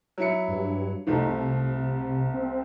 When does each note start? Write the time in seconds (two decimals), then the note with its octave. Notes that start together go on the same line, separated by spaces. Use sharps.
0.18 F#3 E4 C#7
0.48 G2
1.07 C2 F3 A3 D#4
1.28 C3
2.34 C4